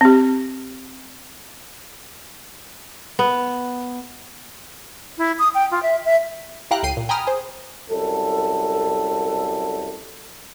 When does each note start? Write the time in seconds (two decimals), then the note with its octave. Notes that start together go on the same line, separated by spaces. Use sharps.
0.01 C4 G4
3.19 B3
5.18 E4
5.39 D#6
5.54 G5
5.71 F4
5.83 E5
6.05 E5
6.71 E4 G4 F5 G5 A#5 F#6
6.83 C#2 A2 G5 C7 D#7
6.97 A#2
7.09 G5 G#5 A#5 B5 D#6 F6
7.27 G#4 C5
7.89 C2 F#2 A4